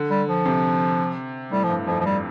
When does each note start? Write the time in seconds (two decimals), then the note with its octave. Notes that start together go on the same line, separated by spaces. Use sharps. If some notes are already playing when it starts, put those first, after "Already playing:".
Already playing: D3
0.11 G3
0.28 F3
0.46 C3
1.52 A2 G3
1.64 F3
1.70 G2
1.87 F2 F3
2.01 F3
2.06 G3